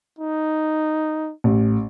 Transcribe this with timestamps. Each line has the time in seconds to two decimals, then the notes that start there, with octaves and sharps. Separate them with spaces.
0.19 D#4
1.44 A1